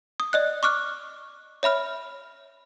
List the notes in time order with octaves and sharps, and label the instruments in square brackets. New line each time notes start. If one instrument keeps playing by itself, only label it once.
[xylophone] D#6
D5 D#5 F#6
C#6 D6 F6 F#6
C#5 E5 B5 F6